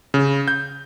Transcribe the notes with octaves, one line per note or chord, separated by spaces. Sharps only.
C#3
G6